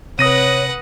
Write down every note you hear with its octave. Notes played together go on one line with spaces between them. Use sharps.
C3 B4 C#5 F#5 D#6 A#6 D#7